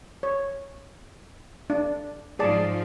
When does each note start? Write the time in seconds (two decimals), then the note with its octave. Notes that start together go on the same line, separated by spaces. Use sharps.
0.23 C#5
1.70 D4
2.39 G#2 F3 G#4 D5 A5